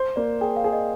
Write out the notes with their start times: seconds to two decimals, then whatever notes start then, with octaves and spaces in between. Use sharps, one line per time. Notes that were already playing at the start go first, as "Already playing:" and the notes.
Already playing: C5
0.16 A#3 D5
0.41 G#4 G5
0.56 F5
0.64 G#4
0.73 D#5